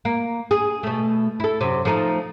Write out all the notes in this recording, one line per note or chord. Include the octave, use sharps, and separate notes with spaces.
A#3
G#4
B2 A3
E4 A4
F#2 C3
F3 A3 D#4